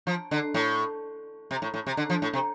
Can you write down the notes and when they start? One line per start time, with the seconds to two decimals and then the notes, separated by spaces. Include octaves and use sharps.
0.07 F3
0.31 D3
0.54 A2
1.51 C3
1.62 A2
1.74 A2
1.87 C3
1.97 D3
2.10 F3
2.22 A2
2.33 C3